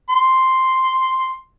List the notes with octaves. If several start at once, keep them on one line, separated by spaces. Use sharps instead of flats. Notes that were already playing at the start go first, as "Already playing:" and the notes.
C6